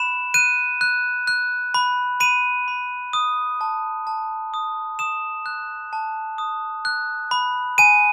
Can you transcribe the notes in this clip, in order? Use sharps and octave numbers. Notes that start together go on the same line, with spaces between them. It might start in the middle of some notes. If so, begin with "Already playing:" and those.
Already playing: B5 F#6 E7
F#6 D#7
F#6
F#6
B5
B5 D#7
B5
D#6
A5
A5
D#6
D#6 E7
F#6
A5
D#6
F#6
B5
G#5 D#7